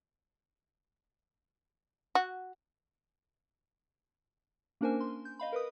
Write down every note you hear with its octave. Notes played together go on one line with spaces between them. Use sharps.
F#4
A#3 C#4 D4 A#4 C5 G#5
C6
G6
D#5 F5 B5
A#4 B4 D#6